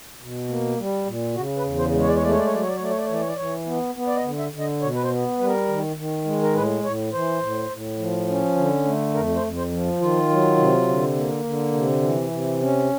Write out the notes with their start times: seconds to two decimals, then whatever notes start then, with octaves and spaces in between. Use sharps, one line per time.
0.20 B2
0.49 A#3
0.78 G3
1.06 A#2
1.35 C#3 F#4
1.57 B4
1.64 E2
1.78 C5
1.92 G#3
2.00 C#5
2.07 D5
2.15 C#5
2.22 A3 D5
2.30 C#5
2.38 D5
2.46 C#5
2.50 F#3 D5
2.61 C#5
2.68 D5
2.76 C#5
2.80 A3 D5
2.90 C#5
2.98 D5
3.05 C#5
3.08 E3
3.13 D5
3.20 C#5
3.28 D5
3.36 E3 C#5
3.66 B3
3.95 B3
4.07 D5
4.16 D#5
4.24 D3
4.38 E5
4.52 D3
4.59 D#5
4.81 B2 C#5
4.94 B4
5.03 C5
5.10 B3
5.39 G3 B4
5.46 A#4
5.68 D#3
5.96 D#3
6.25 G#3
6.42 A#4
6.54 A2 B4
6.83 A2 C#5
7.12 E3 C5
7.40 A2
7.70 A2
7.98 F3
8.28 C#4
8.56 D3
8.85 A3
9.14 F2 A#4
9.36 C5
9.42 F2
9.56 C5
9.71 F3
10.00 D#3 F4
10.29 F#3
10.57 C3
10.87 D3
11.16 A#3
11.44 D3
11.73 C3
12.02 E3
12.31 C3
12.60 C#4